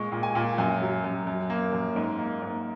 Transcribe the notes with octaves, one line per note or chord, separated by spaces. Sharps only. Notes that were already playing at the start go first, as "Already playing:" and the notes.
Already playing: A#2 G#3 C#6
A#2
G#5
A#2
F#2 G#5
F#3
F#2
F#2
A#3
F#2
G#2
A#3
G#2